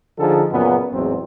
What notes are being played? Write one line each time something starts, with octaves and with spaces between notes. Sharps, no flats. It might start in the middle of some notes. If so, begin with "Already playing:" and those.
D3 F3 D#4 G#4 A4
F#2 A#2 C#3 B3
A1 E2 G#2 F#3 C4